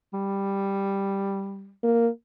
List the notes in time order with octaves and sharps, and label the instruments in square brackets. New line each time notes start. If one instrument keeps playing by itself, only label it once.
[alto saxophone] G3
[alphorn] A#3